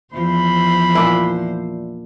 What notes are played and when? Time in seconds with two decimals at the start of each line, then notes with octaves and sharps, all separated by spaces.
0.14 E2 F3 C5 B5
0.95 A#2 D4 E4